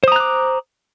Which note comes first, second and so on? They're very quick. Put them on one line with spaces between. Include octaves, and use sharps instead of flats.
C5 D#6 A#5 F#6 D6